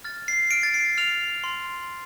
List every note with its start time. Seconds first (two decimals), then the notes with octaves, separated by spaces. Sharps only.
0.04 F6 A6
0.28 C7
0.51 F6 D7
0.63 A6
0.74 C7
0.98 F6 F7
1.44 C6